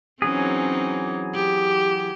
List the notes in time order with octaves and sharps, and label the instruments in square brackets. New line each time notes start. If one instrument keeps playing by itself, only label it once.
[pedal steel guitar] E3 F#3 G#4 [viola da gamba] C4 C#4 D#4
[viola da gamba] G4